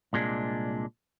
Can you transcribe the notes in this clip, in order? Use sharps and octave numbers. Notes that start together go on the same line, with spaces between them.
C2 A#2 G#3 D4